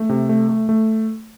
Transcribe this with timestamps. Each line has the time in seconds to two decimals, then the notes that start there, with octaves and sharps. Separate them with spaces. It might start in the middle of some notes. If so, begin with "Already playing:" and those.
Already playing: A3
0.09 C3
0.29 A3
0.49 A3
0.69 A3